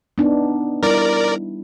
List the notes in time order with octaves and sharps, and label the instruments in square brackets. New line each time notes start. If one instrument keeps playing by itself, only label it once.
[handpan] B3 D4 D#4
[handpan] G3 E4 [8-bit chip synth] A#4 D5